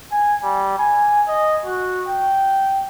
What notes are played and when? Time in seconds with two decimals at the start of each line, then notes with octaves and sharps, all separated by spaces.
0.12 G#5
0.43 G3
0.79 G#5
1.28 D#5
1.65 F#4
2.08 G5